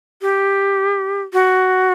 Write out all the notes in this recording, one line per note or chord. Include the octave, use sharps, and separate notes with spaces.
G4
F#4